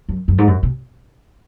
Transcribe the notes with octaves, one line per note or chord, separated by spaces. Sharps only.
F#2
F#2
G#2
F#2
B2